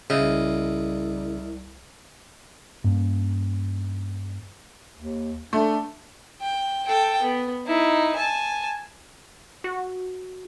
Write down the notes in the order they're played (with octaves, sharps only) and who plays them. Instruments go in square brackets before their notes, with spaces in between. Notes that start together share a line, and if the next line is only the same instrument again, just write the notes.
[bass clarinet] C2 [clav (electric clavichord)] C#3 [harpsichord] E4 F4 D#5
[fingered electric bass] G2 A#3 C#4
[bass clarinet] D#2
[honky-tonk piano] A3 [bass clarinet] D4
[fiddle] G5
A4 G5
B3
D#4 E4
G#5 A5
[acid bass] F#4